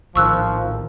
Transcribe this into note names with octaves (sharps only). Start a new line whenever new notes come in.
A#1 A2 D#3 F3 C#6 E6 F#6